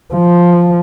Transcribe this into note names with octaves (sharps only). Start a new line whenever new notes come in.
F3